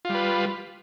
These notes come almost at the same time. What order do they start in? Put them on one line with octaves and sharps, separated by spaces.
F4 G3 B4